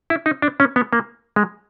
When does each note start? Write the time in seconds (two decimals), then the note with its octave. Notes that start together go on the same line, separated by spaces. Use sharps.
0.10 E4
0.26 D#4
0.42 D4
0.60 C#4
0.76 B3
0.93 A#3
1.36 G#3